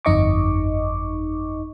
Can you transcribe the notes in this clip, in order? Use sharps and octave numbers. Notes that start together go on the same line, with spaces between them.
G1 F2 D#4 D#5 C#6 D6